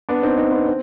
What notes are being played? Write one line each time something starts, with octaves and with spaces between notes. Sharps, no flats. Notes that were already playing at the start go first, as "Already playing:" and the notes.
B3 D4
C4 D#4
C4 D#4
B3 D4
C4